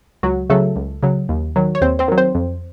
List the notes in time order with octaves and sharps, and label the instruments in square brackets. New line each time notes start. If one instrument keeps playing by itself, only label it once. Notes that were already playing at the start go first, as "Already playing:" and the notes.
[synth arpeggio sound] C#2 F#3 F#4
C#3 F#3 A3 A4
C#2
C#3 F#3
D#2
D#3 F#3
C#5
D#2 C4 C5
C4 C5
D#3 F#3
C4 C5
F2